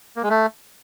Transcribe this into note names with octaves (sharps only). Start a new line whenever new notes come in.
A#3
G#3
A3